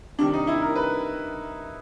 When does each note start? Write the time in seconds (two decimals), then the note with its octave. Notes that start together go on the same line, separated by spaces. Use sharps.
0.19 C3 D#3 G3 D4
0.33 D#4
0.47 E4
0.62 A#4
0.75 B4